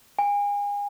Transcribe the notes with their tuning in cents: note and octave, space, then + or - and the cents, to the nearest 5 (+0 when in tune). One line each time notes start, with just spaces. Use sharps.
G#5 -35